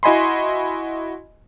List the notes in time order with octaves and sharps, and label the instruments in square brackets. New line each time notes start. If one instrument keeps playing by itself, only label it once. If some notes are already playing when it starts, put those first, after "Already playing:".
[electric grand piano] E4 F#4 D#5 G#5 B5 C6